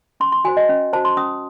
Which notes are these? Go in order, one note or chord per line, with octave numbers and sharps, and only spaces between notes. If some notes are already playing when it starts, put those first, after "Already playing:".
C#4 C6
C6
F#4 C5 G#5
D#5
C#4
F#4 C5 A5
C6
C#4 D#6